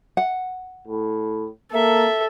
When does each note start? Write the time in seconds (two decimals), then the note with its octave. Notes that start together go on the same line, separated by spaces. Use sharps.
0.17 F#5
0.88 A2
1.73 A#3 A4 E5